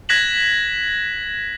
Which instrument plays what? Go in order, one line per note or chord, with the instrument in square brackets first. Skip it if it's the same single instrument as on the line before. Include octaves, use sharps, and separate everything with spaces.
[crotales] F#6 G#6 A#6 B6 E7 F#7